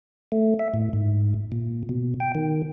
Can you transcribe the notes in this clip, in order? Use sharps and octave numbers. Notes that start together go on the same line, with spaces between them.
A3
E5
A2
G#2
A#2
B2
G5
D#3